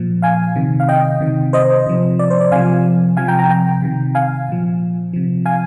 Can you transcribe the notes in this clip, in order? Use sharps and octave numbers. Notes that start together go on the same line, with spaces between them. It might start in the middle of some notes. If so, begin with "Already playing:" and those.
Already playing: A#2 F3
F5 G#5
C3 D#3
F5
D#5 G5
C3 D#3
C5 D#5
C3 F3
D5
C5
D5
C3 F3 F5 G#5
C3 F3 F5 G#5
G5 A#5
G5 A#5
G5 A#5
C3 D#3
F5 G#5
A#2 F3
C3 F3
F5 G#5